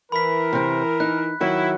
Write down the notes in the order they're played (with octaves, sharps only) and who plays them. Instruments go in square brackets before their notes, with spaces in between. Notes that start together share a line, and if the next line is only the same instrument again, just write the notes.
[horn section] E3 A#4 [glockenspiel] B5 B6
[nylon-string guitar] C3 C4
[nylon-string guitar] D#4 [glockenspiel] F#6
[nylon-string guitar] D#3 F#3 [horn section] E4